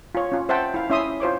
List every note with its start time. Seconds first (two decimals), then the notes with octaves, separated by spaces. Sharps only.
0.15 F4 C#5
0.32 C#4 F4
0.49 C5 E5 F#5 G5 A5
0.74 E4 F5
0.90 C#4 E4 E5 C6 D#6
1.20 F4 C5 C#5 D6